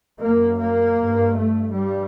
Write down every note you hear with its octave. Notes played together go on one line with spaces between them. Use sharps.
F#2 A#3
A#3
G2
A3
G2 G3